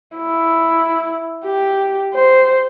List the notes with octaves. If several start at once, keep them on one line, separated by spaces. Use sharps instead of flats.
E4
G4
C5